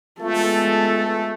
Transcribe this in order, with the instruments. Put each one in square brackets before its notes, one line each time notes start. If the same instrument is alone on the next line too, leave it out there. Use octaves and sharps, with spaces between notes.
[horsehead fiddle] G#3 A4 [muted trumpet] A3 [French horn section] B3 F4